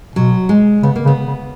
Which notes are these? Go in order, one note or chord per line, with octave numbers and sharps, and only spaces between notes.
B2 F#3
G#3
C#3 B3
A#3
C#3 B3
C#3